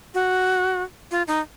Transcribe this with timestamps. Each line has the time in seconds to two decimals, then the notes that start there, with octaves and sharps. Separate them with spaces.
0.14 F#4
1.11 F4
1.28 D#4